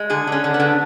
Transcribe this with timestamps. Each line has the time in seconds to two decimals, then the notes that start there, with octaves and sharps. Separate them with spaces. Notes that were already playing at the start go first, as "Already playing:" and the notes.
Already playing: G#3
0.10 D3 G#4
0.27 D3 C#4
0.44 D3
0.54 B3
0.60 D3